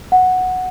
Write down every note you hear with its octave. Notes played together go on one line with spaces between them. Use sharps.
F#5